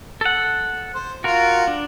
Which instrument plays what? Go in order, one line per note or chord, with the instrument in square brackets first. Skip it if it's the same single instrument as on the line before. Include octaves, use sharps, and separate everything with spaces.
[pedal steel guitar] A4 F#5
[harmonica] C5
[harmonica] F4 [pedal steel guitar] F#4 A#4
[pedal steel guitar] D4